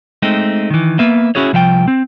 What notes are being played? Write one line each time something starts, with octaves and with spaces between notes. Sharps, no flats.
G#3 A3 C4 D#4
D#3 E3
A#3 B3 B4 E5
C#4 E4 F#4 G#4 C#5
C2 F3 E5 G5
C4